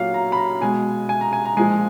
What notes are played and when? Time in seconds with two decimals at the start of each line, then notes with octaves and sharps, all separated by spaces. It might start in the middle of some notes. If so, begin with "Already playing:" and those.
Already playing: A#2 F#3 F5
0.14 A#5
0.32 B5
0.37 A#5
0.61 B2 G#3 G#5
1.09 G#5
1.21 A#5
1.33 G#5
1.45 A#5
1.57 A#2 F3 G#3 G#5